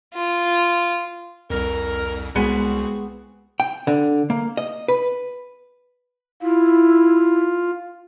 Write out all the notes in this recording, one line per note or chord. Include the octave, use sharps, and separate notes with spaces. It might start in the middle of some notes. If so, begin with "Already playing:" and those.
F4
C2 F2 A#4
C2 G#3 B3 C4 F#4
G5
D3
A#3
D#5
B4
E4 F4